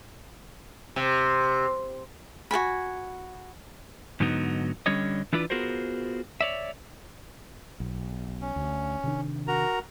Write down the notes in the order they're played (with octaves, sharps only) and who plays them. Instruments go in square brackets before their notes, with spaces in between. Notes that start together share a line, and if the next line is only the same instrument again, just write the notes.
[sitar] C3
[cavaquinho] F#4 A4 G#5 B5
[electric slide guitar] G#2 D3 F#3 B3 D#4
D3 G3 C#4 C#5 D#5
E3 D4 E4 F4 B4 D5
B3 F4 F#4 G#4 A#4 C5
C#5 D5 E5
[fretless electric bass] B1
[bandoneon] C#4
[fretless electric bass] D2
C3 D#3 D4
[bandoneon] F#4 A#4 A#5